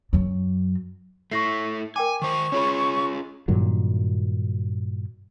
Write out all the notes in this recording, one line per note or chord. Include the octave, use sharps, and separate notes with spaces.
F#2 F#3
A3 E4 C#6 A#6 C7
A#4 G5 G#5 D6
D#3 C5 C#6
C#4 F4 G#4 C#5 B5
G2 A#2 D#3 F#3